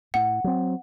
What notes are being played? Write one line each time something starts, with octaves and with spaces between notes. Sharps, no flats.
A2 F#5
F#3 C4